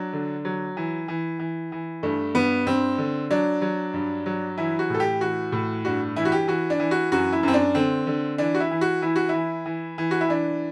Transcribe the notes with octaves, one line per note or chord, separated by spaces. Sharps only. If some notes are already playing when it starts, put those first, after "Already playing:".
Already playing: F#3 D4
D3
F#3
E3
E3
E3
E3
G2 A3
G2 B3
G2 C4
D3
F#3 D4
F#3
G2
F#3
E3 E4
F#4
A2 A4
G4
E3 F#4
A2
G2 F#4
E3 E4
F#4
G4
E3 F#4
D4
E3
F#4
F#2 F#4
E4
F#2 C4
D4
D3 C4
D3
E3 D4
F#4
E4
E3
F#4
E3 E4
F#4
E3 E4
E3
E3
F#4
E4
E3 D4